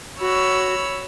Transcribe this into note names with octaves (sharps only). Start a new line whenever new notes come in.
F#4 C#5 B5 E6